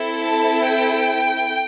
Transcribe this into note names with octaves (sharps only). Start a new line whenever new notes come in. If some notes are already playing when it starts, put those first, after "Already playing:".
Already playing: C4 E4 A4
A5
G5